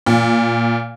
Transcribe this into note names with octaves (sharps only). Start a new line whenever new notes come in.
A#2